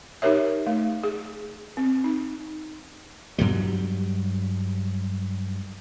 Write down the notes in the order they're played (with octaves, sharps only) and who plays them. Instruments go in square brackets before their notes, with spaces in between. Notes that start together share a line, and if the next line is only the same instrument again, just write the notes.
[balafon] D#4 G4 A#4 C#5 E5
A3
G#4
C4
D#4
[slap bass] G2 F#3 G3